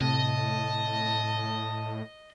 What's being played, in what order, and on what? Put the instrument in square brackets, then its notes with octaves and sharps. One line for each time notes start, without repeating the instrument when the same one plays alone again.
[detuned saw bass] A2 [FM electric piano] C3 [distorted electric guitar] D#5 [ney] A5